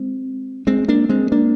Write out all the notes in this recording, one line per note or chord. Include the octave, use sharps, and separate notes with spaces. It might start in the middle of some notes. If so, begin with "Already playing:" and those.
Already playing: G#3 C4
G#3 C4
A#3 D4
G#3 C4
A#3 D4